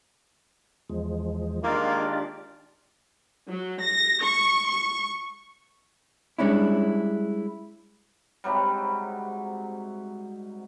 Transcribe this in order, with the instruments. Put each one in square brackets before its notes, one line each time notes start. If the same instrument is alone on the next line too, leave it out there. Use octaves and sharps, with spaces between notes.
[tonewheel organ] E2 F3 G#3
[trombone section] D#3 G#3 F4 [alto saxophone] A#3 [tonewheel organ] D4 G4 D5
[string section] F#3
A#6
C#6
C#6
[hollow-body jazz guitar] G3 G#3 C#4 D4 E4
[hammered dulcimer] G#2 C3 F#3 G3